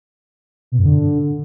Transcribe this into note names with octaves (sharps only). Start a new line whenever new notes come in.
B2
F#2
D3